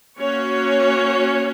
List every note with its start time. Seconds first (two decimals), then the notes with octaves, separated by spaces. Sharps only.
0.19 A#3 C#4 F#4 C#5